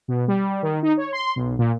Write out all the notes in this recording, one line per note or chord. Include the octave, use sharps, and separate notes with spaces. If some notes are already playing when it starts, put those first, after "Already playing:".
B2
G3
D#3
D#4
C#5
C6
B1
A#2